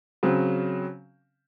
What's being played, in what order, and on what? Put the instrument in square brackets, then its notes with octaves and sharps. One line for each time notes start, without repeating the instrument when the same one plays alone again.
[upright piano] C#3 F#3 C4